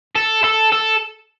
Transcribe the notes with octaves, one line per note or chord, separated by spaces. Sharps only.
A4
A4
A4